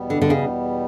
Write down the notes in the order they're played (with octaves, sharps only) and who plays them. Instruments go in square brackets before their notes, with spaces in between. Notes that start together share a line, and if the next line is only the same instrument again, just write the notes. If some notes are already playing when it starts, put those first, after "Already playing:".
Already playing: [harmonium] E2 B2 G3 B3
[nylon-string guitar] D3
D3
C#3